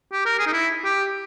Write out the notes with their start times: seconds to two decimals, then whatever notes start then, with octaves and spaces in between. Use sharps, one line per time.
0.13 G4
0.26 A#4
0.39 G#4
0.47 D#4
0.53 E4
0.84 G4